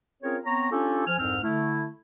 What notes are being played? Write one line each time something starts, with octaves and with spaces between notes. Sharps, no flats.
C4 C#4 F4 G#4 A#4 C#5
B3 C4 C#5 A#5
C#4 D4 F4 G4 A4
F3 G#5 F6
C2 F2 G#2 C4 F6
D3 A3 E4